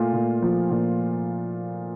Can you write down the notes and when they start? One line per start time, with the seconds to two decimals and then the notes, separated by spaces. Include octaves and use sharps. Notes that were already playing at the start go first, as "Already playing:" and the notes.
Already playing: A#2 A3 F4
0.13 A#2
0.42 F3
0.70 A#2